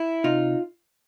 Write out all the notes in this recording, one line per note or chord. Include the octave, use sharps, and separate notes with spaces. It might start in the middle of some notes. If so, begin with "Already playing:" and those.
Already playing: E4
C3 D#4 F4